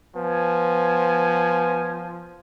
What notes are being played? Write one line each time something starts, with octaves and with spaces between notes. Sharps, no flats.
F3 B3 G#5